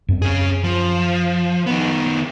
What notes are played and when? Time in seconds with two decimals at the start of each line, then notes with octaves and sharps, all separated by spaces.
0.09 F#2 C4
0.22 C#4 G#4
0.64 F3
1.66 D#3 B3